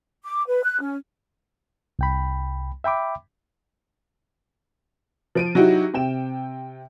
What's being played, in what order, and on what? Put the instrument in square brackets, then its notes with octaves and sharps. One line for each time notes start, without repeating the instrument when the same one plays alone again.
[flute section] D6
B4
F#6
C#4
[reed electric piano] C2 G5 B5
E5 G5 B5 D6
[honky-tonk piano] F3 D7 D#7
F#3 D#4 E4 F#4 G4
C3 G5 E7